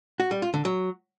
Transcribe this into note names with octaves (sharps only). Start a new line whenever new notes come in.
F#4
G3
F4
D3
F#3